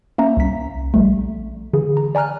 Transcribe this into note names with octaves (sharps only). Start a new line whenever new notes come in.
A#3 C#4 E5 A#5
C2 B6
A#1 G3 A3
D3 E3 G#4
A#5
D5 G#5 A#5 F6 F#6